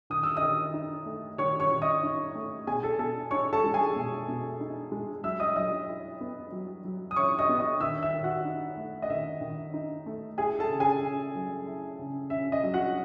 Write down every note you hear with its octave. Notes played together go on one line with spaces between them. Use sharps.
D#3 D#6
E6
D#5 D#6
D#3
D#4
A3
D#3 C#5 C#6
C#5 C#6
D#3
D#5 D#6
D#4
A3
B2 G#4 G#5
A4 A5
B2 A4 A5
D#4 C#5 C#6
A4 A5
G#3
G#4 G#5
B2
B2
D#4
G#3
F#3 E5 E6
D#5 D#6
F#3 D#5 D#6
E4
B3
F#3
F#3
D#6
E4 C#5 C#6
D#5 D#6
B3
D#5 D#6
D#3 E5 E6
E5 E6
D#3
F#4 F#5
D#4
A3
D#5
D#3 E5
D#3
D#4
A3
E4 G#4 G#5
A4 A5
C#3
G#4 G#5
C#4
F#3
E4
C#3
C#4 E5
D#5
F#3
F#4 F#5